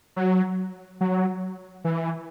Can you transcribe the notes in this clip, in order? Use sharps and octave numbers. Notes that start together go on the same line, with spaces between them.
F#3
F#3
E3